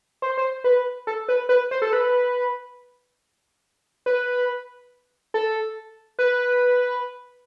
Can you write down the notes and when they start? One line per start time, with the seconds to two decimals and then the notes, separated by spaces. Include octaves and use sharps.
0.22 C5
0.37 C5
0.64 B4
1.07 A4
1.29 B4
1.49 B4
1.71 C5
1.82 A4
1.93 B4
4.06 B4
5.34 A4
6.19 B4